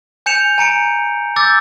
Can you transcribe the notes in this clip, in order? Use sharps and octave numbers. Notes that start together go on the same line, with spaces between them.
G#5 G6 C#7 E7 F7
G#5 A#5 C#7 D7
D6 E6 G6 A6